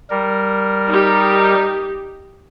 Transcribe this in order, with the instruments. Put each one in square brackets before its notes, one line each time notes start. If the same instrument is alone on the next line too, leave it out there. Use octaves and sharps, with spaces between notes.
[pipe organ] G3 A#4
[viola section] D#4 G4